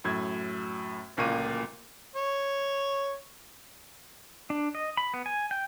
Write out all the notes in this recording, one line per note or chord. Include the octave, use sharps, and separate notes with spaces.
F#2 A2 G#6
D1 C#2 A#2 A#3 C#6 D#7
C#5
D4
D#5
B5
B3
G#5
G5